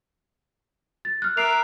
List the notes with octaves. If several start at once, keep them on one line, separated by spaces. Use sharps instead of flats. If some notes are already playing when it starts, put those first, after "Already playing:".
A6
F6 F#6
A#4 E5 D6 F#6 C7 F7